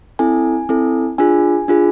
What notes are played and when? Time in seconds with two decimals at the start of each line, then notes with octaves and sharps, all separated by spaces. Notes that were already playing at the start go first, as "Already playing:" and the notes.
0.19 C4 E4 A4 G#5
0.69 C4 E4 A4
1.18 D4 F4 G#4 G#5
1.68 D4 F4 G#4